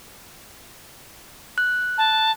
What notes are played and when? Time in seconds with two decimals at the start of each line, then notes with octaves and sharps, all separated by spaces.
1.58 F#6
1.98 A5